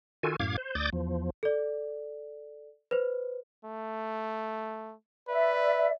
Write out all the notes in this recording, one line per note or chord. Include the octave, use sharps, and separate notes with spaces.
D#3 F4 F#4 A4 G#5
F#2 A2 F5 D6 G#6
C5
D2 D5 D6 D#6 G6 A6
E2 F3
A4 D5
B4 C5
A3
B4 D5 E5